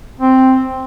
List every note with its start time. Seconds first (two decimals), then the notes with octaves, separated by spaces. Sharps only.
0.19 C4